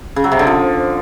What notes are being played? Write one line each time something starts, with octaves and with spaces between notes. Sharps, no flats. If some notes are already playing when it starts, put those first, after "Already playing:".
C#3
F#3
C3
D3
F3